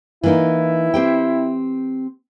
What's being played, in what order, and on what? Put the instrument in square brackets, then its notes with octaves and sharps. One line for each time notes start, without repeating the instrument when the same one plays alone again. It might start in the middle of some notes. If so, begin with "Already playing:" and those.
[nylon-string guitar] E3 A#3 D#4 [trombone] E4
[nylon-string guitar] C4 G4 G5